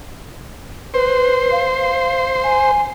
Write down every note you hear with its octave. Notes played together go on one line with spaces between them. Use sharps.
B4 C5
F5
G#5